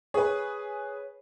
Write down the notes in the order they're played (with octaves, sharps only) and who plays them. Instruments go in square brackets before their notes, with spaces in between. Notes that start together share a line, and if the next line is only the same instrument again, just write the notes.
[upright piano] G#4 B4 [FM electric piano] C#5